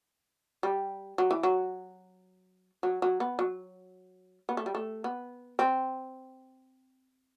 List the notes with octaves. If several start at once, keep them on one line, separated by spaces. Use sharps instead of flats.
G3
F#3
E3
F#3
F#3
F#3
B3
F#3
B3
A3
G3
A3
B3
C4